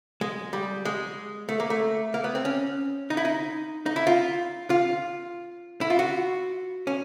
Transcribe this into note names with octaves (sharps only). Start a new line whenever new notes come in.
G#3
G3
G#3
A3
A#3
A3
A#3
B3
C4
C#4
D#4
E4
D#4
D#4
E4
F4
F4
E4
F4
F#4
C#4